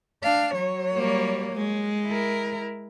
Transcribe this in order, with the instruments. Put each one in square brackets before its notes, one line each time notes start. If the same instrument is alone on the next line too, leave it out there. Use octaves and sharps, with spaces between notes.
[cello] D4 F5
F#3 C#5
[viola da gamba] G3 A#3
G#3
[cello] E4 A#4